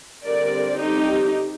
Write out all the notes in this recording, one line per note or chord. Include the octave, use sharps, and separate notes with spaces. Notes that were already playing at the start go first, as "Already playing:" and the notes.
D3 G3 C4 A#4 D5
D#4 G4